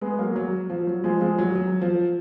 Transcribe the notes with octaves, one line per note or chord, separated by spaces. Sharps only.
G#3 B3
F#3 A#3
F#3
F3
F#3
F3 G#3
F3 G#3
F#3
F#3
F3